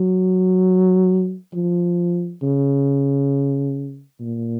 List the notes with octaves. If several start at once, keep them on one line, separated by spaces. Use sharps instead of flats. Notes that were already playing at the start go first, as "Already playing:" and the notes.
Already playing: F#3
F3
C#3
A#2